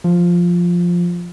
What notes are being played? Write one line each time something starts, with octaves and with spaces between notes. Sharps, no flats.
F3